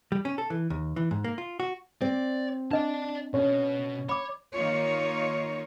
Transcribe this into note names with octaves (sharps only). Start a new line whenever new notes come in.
G3
C#4
A4
E3
D#2
E3
G#2
A#3
F4
F#4
C4 D5
D4 D5 D#5 A5
B2 C#4
C#5 B5 D6
D#3 A#3 D#4 F4 C#5